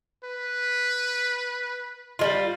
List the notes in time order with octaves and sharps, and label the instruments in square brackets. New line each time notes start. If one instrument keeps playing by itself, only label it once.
[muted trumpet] B4
[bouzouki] G3 G#3 F4